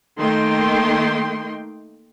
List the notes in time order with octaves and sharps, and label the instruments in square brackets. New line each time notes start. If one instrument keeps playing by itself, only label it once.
[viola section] D#3 A3 A#3 D#4 G5 C6